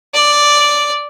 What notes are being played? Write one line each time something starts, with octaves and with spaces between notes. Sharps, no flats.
D5